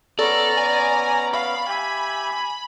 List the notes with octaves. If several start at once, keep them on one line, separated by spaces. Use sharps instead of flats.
B3 C#4 A4 D5 A#5
G#5
F5 B5
G4 E5 G#5